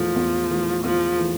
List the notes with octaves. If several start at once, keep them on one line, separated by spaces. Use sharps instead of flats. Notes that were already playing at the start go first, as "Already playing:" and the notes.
Already playing: E2 E3 F3 A3
E2
E3 A3
E2 F3
E3 A3